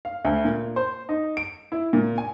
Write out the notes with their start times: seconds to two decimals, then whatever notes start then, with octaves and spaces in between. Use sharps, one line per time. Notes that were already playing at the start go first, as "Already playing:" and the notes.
0.05 F5
0.25 D2
0.45 A#2
0.76 C5
1.09 D#4
1.37 D7
1.72 E4
1.93 A#2
2.18 G#5